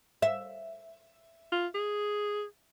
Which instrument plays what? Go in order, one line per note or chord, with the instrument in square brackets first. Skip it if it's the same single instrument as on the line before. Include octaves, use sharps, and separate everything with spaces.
[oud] E5
[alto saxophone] F4
G#4